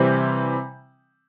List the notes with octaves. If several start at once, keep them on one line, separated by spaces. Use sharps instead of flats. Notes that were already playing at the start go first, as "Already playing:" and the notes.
Already playing: C3 E3 G3 C4